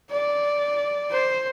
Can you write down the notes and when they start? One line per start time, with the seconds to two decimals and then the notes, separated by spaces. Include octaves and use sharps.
0.11 D5
1.11 C5